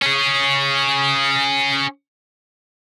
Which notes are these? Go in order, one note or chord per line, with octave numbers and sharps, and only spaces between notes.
C#4 G#4